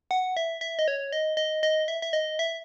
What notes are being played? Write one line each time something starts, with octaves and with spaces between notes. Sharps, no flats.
F#5
E5
E5
D#5
C#5
D#5
D#5
D#5
E5
E5
D#5
E5